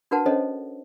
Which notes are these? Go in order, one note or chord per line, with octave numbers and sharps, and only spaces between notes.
D4 F#4 A#4 B4 F#5 A5
C#4 D4 A4 C5 C#5 D#5